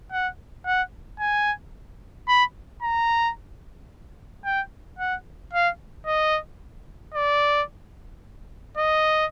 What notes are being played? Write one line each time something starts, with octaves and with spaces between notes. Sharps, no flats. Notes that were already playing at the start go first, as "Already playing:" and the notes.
F#5
F#5
G#5
B5
A#5
G5
F#5
F5
D#5
D5
D#5